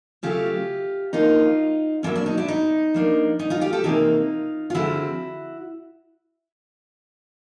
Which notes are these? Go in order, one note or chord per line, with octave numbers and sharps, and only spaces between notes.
C#3 F#3 A3 F4 G4
D3 F3 A#3 D#4 F4
B2 F#3 A#3 C#4 D4 E4
D4
D#4
D4 E4
D#4
F3 A#3 D4
D#4
D#4 F4
F4 G4
G4 A4
C3 E3 G3 A#3 D#4 F4
F4
D3 F3 G#3 C4 E4 F#4